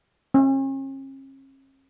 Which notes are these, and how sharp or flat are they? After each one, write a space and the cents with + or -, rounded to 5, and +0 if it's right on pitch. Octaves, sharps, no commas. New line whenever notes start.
C#4 -45